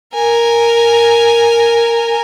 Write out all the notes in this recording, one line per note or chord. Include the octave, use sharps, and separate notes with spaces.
A#4 G#5